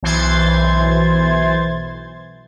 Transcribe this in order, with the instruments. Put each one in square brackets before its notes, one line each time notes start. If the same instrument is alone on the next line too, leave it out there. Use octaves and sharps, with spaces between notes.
[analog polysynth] B1 E3 C5 C6 G#6 A6